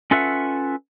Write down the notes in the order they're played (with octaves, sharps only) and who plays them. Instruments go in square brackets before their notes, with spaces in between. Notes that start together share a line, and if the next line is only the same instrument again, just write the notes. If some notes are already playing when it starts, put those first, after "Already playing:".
[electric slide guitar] C#4 F4 A4 B4 E5 F#5